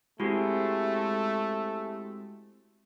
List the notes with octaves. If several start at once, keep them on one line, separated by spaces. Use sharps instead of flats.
G#3 A3 C4 E4 F#4 G4